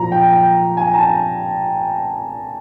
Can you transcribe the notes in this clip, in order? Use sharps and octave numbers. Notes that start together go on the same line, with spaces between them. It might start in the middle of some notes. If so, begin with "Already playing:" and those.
Already playing: A#2 F3 A#5
G5
G5
G#5
A#5
A5